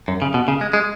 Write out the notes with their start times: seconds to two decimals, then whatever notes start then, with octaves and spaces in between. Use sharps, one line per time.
0.08 F#2
0.22 C#3
0.34 B2
0.48 C#3
0.61 G#3
0.73 G#3